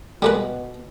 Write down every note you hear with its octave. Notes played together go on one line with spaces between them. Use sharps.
B2 G3 G#3 B4